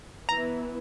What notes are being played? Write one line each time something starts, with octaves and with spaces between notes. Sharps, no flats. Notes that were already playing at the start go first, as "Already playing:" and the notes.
E3 B3 E4 B4 A#5